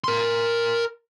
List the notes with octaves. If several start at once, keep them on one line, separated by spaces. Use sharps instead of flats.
A#4 C6